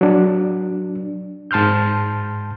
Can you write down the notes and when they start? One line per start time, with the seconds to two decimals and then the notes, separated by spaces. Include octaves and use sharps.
0.01 F#3 D4
1.51 G#2 A5 C6 F6 G6